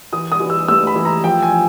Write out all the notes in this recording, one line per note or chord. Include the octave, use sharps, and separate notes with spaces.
E3 D#6
D#6
E3
E6
A3 E6
B5
E3
A#5
F3 G5
G#5
F3